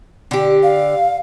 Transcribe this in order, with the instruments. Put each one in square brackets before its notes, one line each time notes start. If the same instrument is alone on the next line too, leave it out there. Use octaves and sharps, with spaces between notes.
[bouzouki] D3 G4
[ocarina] F5